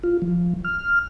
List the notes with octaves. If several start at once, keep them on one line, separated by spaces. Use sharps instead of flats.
F4
F3
F6